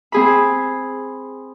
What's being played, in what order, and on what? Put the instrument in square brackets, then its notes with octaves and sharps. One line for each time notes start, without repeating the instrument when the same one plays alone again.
[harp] C4 G#4 B5